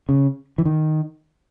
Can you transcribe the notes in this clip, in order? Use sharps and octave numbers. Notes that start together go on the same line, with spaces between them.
C#3
E3
D#3